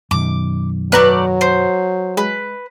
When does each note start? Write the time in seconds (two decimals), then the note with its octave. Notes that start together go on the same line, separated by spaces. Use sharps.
0.11 F#2 B2 D#3 D6
0.92 G#1 F#3 A3 B4 D5 A#5 F#6
1.41 C5
2.17 G#3 B4